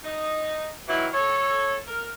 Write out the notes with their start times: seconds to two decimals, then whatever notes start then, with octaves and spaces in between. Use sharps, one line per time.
0.04 D#4 D#5
0.88 D#3 E3 F#3 E4
1.13 A4 C#5
1.87 A#4